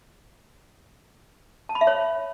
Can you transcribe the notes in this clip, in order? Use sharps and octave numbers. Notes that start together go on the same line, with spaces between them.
A5
B5
E5
C#5